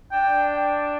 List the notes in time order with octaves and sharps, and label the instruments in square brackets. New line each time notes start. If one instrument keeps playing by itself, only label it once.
[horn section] D4 [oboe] G5